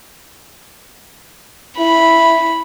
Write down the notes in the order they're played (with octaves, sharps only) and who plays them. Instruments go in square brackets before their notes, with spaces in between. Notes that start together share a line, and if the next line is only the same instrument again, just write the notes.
[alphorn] E4 [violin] B5